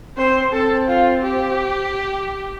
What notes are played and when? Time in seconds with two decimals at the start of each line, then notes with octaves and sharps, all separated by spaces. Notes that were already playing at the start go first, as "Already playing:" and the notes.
0.17 C4 C5
0.52 C4 A4
0.88 F4
1.23 G4